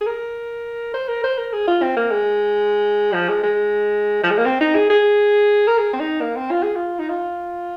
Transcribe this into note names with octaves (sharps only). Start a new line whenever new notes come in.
G#4
A#4
C5
A#4
C5
A#4
G#4
F4
C4
A#3
G#3
F3
G#3
G#3
F3
G#3
A#3
C4
D#4
G#4
G#4
A#4
G#4
C4
D#4
A#3
C4
F4
G#4
F4
D#4
F4